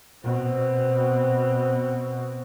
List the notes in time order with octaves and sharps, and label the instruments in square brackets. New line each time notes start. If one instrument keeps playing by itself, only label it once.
[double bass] B2 C4